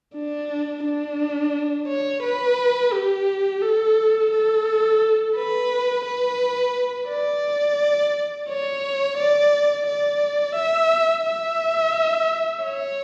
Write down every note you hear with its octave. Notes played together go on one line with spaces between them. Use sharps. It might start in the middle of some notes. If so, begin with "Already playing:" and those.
D4
D4
C#5
B4
G4
A4
A4
B4
B4
D5
C#5
D5
D5
E5
E5
C#5